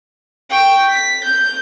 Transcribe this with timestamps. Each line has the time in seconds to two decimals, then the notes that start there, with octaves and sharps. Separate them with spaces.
0.50 G5 C#6
0.89 B6
1.24 G6